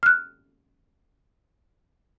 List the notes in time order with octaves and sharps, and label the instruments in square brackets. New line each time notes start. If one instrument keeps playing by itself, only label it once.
[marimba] F6 F#6